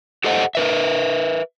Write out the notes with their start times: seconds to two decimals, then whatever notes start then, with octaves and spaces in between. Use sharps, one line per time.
0.24 G4 A4 C5 D#5 F#5
0.55 A#4 B4 E5